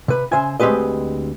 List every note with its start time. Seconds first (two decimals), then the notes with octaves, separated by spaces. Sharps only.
0.08 C3 B4
0.32 C#3 C5 E5 G#5
0.60 D2 G#3 C4 G4 B4 D#5